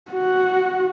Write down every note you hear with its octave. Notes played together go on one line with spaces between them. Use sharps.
F#4